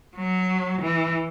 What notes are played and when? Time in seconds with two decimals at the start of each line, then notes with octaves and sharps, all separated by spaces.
0.16 F#3
0.81 E3